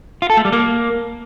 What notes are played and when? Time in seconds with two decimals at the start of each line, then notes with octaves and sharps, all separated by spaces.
0.22 F4
0.30 A4
0.37 A3
0.45 G3
0.52 A#3